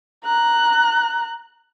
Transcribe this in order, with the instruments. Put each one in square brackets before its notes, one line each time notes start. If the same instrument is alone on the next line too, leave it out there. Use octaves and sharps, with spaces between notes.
[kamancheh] A#5 F#6